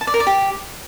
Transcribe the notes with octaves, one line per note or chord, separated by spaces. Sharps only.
A5
D5
A#4
D5
G4